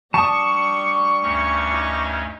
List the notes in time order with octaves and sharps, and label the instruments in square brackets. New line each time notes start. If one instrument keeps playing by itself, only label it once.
[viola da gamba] G3 D4 [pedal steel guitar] A5 D#6 [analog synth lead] C#6
[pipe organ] D2 G2 C#4
[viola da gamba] D#4